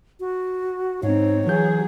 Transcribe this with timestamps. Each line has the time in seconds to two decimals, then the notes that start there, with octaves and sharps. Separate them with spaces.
0.20 F#4
1.03 G#2 C4 D#4 C#5
1.47 E3 F#3 G#4 G6